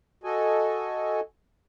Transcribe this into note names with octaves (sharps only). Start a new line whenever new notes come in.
F#4 A4 D#5 G#5